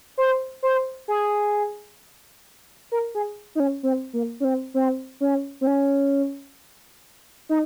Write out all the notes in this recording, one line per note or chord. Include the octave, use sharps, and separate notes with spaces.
C5
C5
G#4
A#4
G#4
D#4
C#4
C4
A#3
C#4
C4
C4
C#4
C4
C#4
D#4